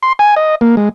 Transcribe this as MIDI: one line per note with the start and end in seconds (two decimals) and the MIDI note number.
0.03 0.13 84
0.19 0.35 80
0.36 0.55 75
0.61 0.75 58
0.77 0.89 56